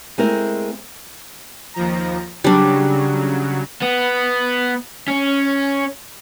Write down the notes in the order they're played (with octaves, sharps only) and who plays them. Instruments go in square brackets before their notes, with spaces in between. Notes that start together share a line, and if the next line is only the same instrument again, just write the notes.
[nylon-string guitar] G#3 A3 C4 E4 A#4
[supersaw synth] D#2 F3 A#5
[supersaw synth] C#3 F#3 [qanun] G3 D4
[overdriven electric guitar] B3
C#4